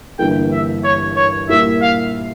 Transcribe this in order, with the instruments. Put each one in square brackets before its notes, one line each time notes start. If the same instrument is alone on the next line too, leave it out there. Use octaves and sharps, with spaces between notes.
[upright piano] G1 G2 E3 A#3 [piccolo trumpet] G5
[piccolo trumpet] E5
C#5
C#5
[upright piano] A#2 G3 A#3 E4 [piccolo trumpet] E5
[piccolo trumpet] F5